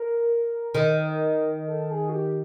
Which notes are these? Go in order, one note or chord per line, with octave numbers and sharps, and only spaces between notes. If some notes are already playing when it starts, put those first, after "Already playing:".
Already playing: A#4
D#3
A4
G#4
F#4
G4